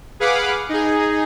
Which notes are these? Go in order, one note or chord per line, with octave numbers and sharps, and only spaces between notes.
G#4 B4 F5 F#5 B5 D6
D#4 G#4